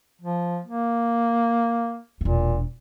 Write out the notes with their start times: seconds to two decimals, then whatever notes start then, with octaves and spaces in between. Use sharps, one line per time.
0.21 F3
0.64 A#3
2.21 E1 A#2 D4